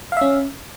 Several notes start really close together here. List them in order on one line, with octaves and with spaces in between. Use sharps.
F5 E5 C#4